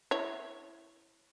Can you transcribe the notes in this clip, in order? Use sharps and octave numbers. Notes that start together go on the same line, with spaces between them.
E4 C#5